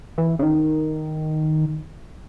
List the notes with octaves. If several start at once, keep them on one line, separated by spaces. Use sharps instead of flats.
E3
C#3
D#3